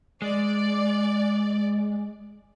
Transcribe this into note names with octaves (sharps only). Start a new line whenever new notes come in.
G#3 D5